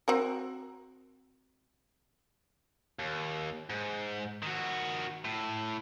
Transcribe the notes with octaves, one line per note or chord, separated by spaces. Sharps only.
C4 F#4 A#4
D#2
G#2
D#3 F#4
A2